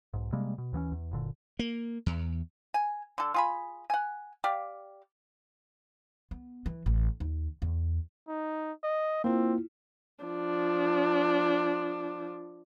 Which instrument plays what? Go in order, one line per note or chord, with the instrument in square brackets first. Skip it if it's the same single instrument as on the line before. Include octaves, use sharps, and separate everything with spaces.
[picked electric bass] B1 G#2
C3 G3 G#3 A#3
B2
D#2 E3 B3 C#4
E2
F#1 A#2 D3
[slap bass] A#3
E2
[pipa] G#5
D3 A4
F4 G#4 B5
F#5 G#5
G4 D5 F5
[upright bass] B3
E3
A1
D#2
E2
[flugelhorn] D#4
D#5
[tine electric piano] A#3 [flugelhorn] C4 [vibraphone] E4 F4
[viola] F3 D4